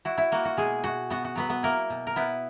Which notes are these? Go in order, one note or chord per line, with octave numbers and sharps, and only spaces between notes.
E4 F#4
E4
A#3 F#4
F#4
B2 G#3 G#4
B2 F#4
B3 F#4
F#4
F#3 B3 B4
B3 B4
A#3 E4 A#4
B2
A#4
B3 E4 B4